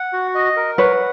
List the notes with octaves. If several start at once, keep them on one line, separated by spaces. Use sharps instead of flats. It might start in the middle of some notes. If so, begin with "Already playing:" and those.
Already playing: F#5
F#4
D#5
A#4
B4 C#5 F#5